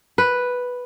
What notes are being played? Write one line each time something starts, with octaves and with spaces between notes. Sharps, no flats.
B4